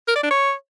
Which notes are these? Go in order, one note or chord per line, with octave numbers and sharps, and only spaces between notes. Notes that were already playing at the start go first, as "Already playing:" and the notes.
A#4
D5
D4
C#5